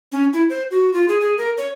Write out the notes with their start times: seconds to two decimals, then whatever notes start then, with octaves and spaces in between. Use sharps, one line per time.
0.12 C#4
0.33 E4
0.50 C5
0.71 F#4
0.93 F4
1.08 G#4
1.21 G#4
1.38 A#4
1.57 C#5